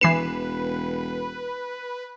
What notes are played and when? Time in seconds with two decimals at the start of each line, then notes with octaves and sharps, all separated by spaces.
0.01 E1 E3 B4 C7 E7